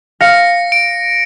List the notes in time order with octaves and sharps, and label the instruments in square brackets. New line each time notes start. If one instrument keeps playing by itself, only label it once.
[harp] F5 [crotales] A#6 C#7
[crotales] D7